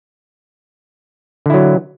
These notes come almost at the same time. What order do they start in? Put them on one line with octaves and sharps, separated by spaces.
D3 E4 F#3